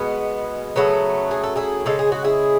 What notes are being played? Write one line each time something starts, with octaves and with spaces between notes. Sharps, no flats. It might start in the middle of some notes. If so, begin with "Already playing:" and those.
Already playing: B2 G#3 B3
C#3 F#3 A3 B3
G#4
A4
E4 G#4
C#3 G#3 A4
G#4
F#4
E4 G#4